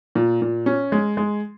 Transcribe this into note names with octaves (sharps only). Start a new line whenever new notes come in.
A#2
A#2
C#4
G#3
G#3